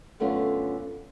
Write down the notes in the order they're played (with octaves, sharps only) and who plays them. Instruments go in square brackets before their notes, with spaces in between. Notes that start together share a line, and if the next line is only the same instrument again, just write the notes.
[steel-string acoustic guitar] F#2 D3 A3 B3 C#4 F4